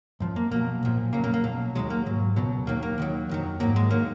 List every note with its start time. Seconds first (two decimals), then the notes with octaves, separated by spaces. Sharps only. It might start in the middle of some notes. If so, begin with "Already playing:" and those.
0.20 F#2 F3
0.36 A#3
0.51 B1 B2 F#3 A#3
0.83 B1 A#2 F3
1.13 F2 C#3 F#3 A#3
1.24 A#3
1.34 A#3
1.44 B1 B2 F#3
1.75 D#2 D#3 F#3 G#3
1.90 A#3
2.06 G#2 F#3
2.36 C#2 B2 F#3
2.67 D#2 D#3 F#3 A#3
2.83 A#3
2.98 D#2 D#3 F#3
3.29 F2 D#3 F#3
3.60 G#2 D#3 F#3 A#3
3.76 G#3
3.91 D#3 F#3 A#3